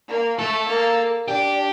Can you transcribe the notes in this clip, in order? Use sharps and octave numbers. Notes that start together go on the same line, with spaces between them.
A#3
A3 A4
A#3
D4 G4